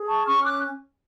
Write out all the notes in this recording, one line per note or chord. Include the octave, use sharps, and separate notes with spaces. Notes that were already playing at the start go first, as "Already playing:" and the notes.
Already playing: G#4
A5 C#6
C#4 C#6 F6
D6 F#6